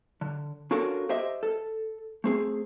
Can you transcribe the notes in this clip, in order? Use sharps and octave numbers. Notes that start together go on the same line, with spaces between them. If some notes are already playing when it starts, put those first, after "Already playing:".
D3
C#4 D4 F4 F#4 A4 A#4
G4 C5 D#5 E5
A4
A3 C4 G#4